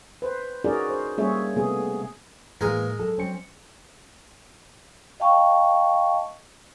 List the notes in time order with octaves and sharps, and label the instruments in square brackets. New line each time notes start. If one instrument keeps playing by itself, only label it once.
[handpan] B4 C5
C#4 D#4 F#4 G#4 A#4 D5
C5
G3 A#3 C#4 G#4 C#5 E5
C3 A3 B3 G#4
[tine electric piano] A2 [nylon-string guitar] E3 G3 A#3 [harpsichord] G#3 G#4 A#4
[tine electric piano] F#3 [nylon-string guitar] A4
[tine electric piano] F#3 C5 C#7 [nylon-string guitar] C4 C#4
[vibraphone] D#5 F5 G5 A5 C#6